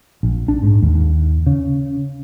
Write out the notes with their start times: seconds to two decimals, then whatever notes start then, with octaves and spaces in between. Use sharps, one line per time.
0.23 A#1
0.48 D4
0.63 G#2
0.82 D#2
1.47 C#3